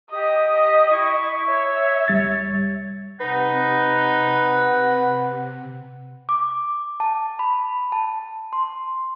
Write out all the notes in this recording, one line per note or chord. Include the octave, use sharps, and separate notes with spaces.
G4 D#5 D#6
E4 C#6
C#5 E5
C2 G3 A6
C3 D#4 B4 F#5
D6
A5
B5
A5
C6